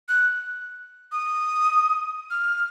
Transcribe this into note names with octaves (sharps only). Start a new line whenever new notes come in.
F#6
D#6
F6